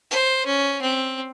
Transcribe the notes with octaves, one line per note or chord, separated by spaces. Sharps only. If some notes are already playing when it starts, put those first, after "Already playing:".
C5
C#4
C4